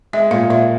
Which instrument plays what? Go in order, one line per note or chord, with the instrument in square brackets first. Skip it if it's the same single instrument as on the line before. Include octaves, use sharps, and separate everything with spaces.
[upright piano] G#3 [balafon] E5
[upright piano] A#2 [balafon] F5
[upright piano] A#2 [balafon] E5